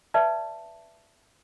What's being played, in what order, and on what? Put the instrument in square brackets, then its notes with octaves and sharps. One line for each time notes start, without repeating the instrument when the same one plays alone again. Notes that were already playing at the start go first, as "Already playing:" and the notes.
[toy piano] B4 D5 E5 A5